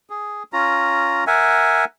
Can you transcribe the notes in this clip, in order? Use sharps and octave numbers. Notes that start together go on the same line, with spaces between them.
G#4
C#4 F4 A#5
A#4 E5 F#5 G#5